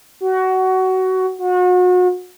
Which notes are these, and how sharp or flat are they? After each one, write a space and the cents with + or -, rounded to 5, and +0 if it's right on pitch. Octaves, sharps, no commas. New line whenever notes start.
F#4 +20
F#4 -35